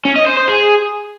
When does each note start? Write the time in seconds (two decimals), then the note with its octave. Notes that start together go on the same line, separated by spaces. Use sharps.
0.05 C#4
0.16 D#5
0.26 C5
0.37 C5
0.48 G#4